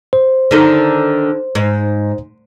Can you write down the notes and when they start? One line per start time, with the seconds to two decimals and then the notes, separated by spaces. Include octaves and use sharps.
0.13 C5
0.51 D3 D#3 A4
1.55 G#2